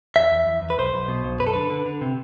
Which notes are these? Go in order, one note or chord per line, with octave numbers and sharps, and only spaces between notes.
E2 E5
E2
E2
E2
B4
B1 C5
B1
B2
B1
F#2 B4
A4
D3 B4
D3
D3
C3